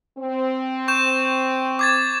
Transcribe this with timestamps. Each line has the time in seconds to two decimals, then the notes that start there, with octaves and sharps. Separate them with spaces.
0.18 C4
0.88 C#6 G6 E7
1.79 D6 G#6 A6